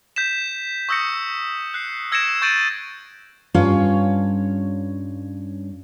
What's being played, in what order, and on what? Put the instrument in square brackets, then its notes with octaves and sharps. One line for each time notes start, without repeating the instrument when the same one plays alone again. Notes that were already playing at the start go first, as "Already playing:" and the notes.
[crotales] G6 B6 E7
C#6 D#6 E6 G6 A#6 C#7
F#6 C7
E6 G#6 A#6 C#7 D7 E7
C#6 G6 A6 D7 D#7 F#7
[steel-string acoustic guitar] G2 C#4 F4 C#5 F5